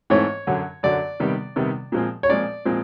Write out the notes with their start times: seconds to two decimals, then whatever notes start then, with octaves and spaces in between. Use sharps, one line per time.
0.10 G#2 E3 A3 C4 C#5
0.47 F#2 D3 F#3
0.83 F#2 D3 F#3 D5
1.20 C3 D#3 G3 B3
1.56 C3 D#3 G3 B3
1.92 A#2 F3 G#3 C4
2.23 C#5
2.29 A#2 F3 G#3 C4 D5
2.65 A#2 F3 G#3 C4